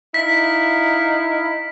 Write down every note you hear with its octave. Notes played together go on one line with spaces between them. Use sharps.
D#4 E4 F5 B6